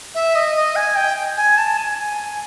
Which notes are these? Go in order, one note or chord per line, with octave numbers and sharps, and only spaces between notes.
E5
D#5
D#5
G#5
G5
G#5
A5
G#5
G#5